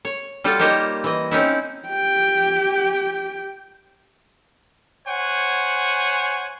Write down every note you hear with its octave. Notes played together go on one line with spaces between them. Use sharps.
C#5
G3 F4 F#4 A4
A#3 D#4 G4 C5 C#5 D#5
E3 D#5
C4 C#4 D#4 E4
G4 G5
C5 C#5 F#5 G#5